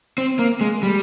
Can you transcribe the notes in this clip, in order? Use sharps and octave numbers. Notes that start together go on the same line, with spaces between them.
C4
A#3
G#3
G3